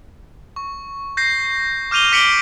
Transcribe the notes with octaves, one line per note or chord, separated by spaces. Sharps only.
C#6
G6 A#6 C7
D6 F6 G6 D#7 F7 G7
D6 B6 C#7 D7 F#7 G7